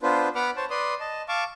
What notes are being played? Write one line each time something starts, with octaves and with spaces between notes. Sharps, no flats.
B3 D4 F4 B4 C5
B3 B4 F#5 B5 D6 F6
C5 C#5 A5
B4 D5 C6 D#6
D#5 A5
F5 A5 C#6 D6